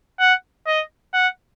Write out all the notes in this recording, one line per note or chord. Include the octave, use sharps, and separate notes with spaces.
F#5
D#5
F#5